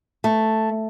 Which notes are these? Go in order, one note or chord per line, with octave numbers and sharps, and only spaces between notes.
A3